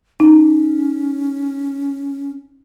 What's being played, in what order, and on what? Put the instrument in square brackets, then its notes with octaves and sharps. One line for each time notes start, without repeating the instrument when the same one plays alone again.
[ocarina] C#4 [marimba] D#4